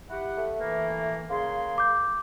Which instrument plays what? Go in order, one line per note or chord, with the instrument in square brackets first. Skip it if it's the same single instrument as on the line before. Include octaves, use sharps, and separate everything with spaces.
[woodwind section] E4 G4 F#5
[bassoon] A3
[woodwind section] E3 A#3
[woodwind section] C#3 G#4 C6 [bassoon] A#3
[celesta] D6 G6